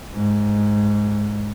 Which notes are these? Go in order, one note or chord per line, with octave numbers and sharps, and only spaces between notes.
G#2